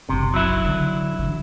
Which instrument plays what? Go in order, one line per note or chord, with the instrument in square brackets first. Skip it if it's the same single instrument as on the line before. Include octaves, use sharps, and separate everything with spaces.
[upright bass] F#1 B1 [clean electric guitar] C3
[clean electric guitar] F#3 E4
[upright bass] D3
D3 E3